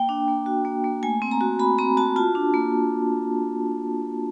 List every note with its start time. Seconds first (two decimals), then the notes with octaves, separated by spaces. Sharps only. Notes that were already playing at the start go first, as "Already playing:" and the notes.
Already playing: A#3 G5
0.09 D4
0.28 A#3
0.46 F#4
0.65 A#3
0.84 A#3
1.03 A3 G#5
1.22 C4
1.31 A#5
1.41 F#4
1.59 F#4 B5
1.78 C4 A#5
1.97 F#4 A5
2.16 F4 A5
2.35 D4
2.54 A#3